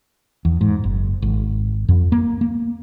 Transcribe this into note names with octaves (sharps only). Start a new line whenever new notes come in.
E2
G#2
F#1
G#1
F2
A#3
A#3